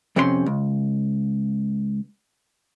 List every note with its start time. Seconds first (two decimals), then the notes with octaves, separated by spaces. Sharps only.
0.16 F2 C3 C4 C#4 B4 C6
0.46 C#2